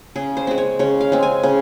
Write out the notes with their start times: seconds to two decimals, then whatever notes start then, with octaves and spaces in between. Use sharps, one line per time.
0.16 C#3 G#4
0.37 C5
0.47 G#3 C4
0.58 C#5
0.79 C#3 C#5
1.01 F5
1.12 G#3 C4
1.23 G#5
1.43 C#3